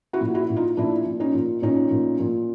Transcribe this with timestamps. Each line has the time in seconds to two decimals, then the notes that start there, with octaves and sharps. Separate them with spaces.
0.13 E4 F#4
0.21 A#2
0.34 E4 F#4
0.50 A#2
0.56 D#4 F4
0.77 A#2 D4 E4
1.06 A#2
1.20 C#4 D#4
1.34 A#2
1.62 A#2 C#4 D#4
1.91 A#2
2.20 A#2